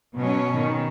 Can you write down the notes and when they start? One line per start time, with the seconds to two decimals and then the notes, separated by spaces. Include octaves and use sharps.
0.17 B2 F#3 C#4
0.59 D#3